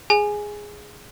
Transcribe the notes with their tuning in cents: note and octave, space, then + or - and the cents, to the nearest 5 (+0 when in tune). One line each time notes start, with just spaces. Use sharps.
G#4 +0 G#5 +0